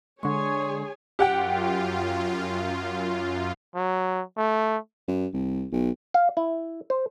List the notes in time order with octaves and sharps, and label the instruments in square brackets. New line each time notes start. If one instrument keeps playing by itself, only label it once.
[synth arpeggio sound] D3 G#3 [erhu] G#4 [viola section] C#5 G#5 [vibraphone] C6 C#6
[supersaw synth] F#2 F4 [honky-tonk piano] G4 F#5 G5
[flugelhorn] F#3
A3
[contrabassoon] F#2
C2
B1
[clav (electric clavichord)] F5
E4
C5